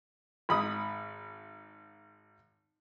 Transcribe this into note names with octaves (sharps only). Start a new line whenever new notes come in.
G#1 B5 D#6